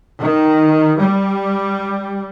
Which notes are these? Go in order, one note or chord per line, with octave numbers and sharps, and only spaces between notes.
D#3
G3